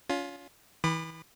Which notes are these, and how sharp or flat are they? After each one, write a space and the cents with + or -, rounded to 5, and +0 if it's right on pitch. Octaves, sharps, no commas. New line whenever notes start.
C#4 +35 F4 +15
E3 -30 B5 +10 D#6 -45